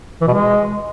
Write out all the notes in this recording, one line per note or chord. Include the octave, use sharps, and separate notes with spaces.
E3
B2
G#3